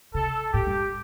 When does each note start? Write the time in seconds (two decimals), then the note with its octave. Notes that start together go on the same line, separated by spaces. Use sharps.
0.14 C3 A4
0.53 A2 G4
0.67 G2